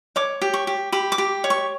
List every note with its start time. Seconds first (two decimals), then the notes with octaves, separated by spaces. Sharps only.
0.16 C#5 D6
0.41 G4
0.54 C#6
0.67 G4
0.92 G4 B5
1.12 D6
1.18 G4
1.44 C#5
1.50 C#6